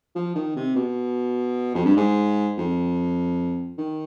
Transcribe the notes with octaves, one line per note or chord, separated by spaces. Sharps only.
F3
D#3
C3
B2
F2
G2
G#2
F2
D#3